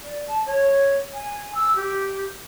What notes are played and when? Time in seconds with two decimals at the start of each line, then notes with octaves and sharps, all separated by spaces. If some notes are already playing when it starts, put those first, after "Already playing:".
0.03 D5
0.28 A5
0.46 C#5
1.14 G#5
1.55 E6
1.76 G4